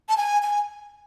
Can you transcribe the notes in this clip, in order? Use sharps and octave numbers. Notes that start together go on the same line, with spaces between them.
A5
G#5
G#5